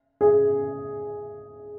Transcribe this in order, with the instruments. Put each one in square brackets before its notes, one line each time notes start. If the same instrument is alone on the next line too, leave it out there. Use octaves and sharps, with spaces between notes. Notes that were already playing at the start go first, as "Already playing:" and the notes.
[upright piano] G#4